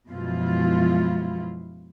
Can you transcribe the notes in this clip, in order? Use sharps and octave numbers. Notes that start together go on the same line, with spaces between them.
F#2 B2 F3 G#3 E4 F4